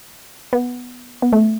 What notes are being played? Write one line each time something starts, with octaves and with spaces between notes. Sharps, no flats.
B3
B3
A3